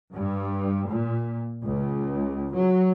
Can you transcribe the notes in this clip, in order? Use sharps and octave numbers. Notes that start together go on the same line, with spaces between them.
G2
A#2
C#2
F#3